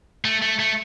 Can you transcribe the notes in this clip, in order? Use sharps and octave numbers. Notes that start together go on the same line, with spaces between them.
A3
A3
A3